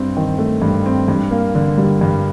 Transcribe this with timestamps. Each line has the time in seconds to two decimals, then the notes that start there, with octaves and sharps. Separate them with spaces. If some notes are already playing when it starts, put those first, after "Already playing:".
Already playing: G2 C4
0.17 D#3
0.39 A3
0.62 G2
0.86 C4
1.08 G2
1.31 A#3
1.55 D3
1.78 G3
2.01 G2